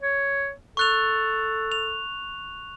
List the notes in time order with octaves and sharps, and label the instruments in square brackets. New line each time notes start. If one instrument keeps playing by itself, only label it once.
[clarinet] C#5
[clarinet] A4 [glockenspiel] C#6 F#6 F7
[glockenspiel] F7